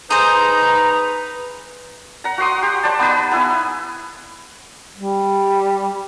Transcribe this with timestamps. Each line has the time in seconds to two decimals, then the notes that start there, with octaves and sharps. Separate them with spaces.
0.10 D#4 G#4 B4 C5 A#5
2.24 F#5 A#5
2.38 F#4 F#5 C6 D#6
2.62 G4
2.83 B4 C5 D5 A5
2.99 B3 D#4 B4
3.31 B3 E4 G#5
4.96 G3